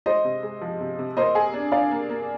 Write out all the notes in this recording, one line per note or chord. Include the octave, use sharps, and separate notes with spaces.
G#3 C5 D#5
C3
G#3
F3
C3
C3
A#3 C5 D#5
G#4
D4
D4 D5 F5
A#3
A#3